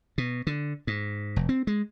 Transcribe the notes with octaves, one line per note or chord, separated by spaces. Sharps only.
B2
D3
G#2
F1
C4
G#3